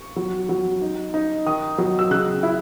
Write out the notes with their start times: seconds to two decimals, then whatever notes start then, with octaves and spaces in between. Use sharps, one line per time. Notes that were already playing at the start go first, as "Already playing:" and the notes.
Already playing: C#6
0.16 F#3
0.49 F#3
0.82 D#4
1.14 D#4
1.46 D#3 D#6
1.78 F#3
1.99 E6
2.11 C#3 F#6
2.43 E4